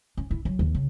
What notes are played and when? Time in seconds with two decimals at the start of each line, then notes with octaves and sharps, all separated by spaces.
0.17 C#4
0.31 E4
0.45 F#3
0.59 D#2
0.75 C#3